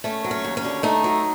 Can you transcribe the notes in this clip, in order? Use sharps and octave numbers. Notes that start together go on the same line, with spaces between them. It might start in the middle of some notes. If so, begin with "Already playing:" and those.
A3 C#4
F#3
C#4
D#2
C#4
D3
A3 D#4
F#3